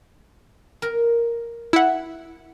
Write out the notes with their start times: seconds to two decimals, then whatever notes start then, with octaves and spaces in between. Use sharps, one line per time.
0.82 A#4
1.73 E4 F#5